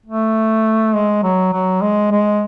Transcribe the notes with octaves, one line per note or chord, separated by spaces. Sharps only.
A3
G#3
F#3
F#3
G#3
G#3